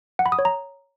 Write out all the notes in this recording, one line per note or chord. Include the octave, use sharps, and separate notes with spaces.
F#5
B5
D#6
C#5
A#5